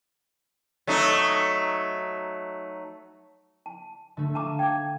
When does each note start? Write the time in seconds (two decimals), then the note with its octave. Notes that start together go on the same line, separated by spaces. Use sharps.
0.87 F#3 A3 D#4
3.66 A5
4.17 D3 A3
4.35 F5 A5 A#5 D6 D#7
4.59 G5 D6 G#6